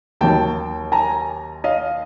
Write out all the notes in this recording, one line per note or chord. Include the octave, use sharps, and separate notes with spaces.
D#2 D#3 F#3 G5 A5
G#5 A#5
D#5 F5